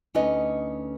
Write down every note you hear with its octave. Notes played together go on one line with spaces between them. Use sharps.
D2 C#4 D#4 B4 D#5